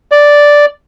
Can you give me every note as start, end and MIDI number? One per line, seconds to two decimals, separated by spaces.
0.12 0.66 74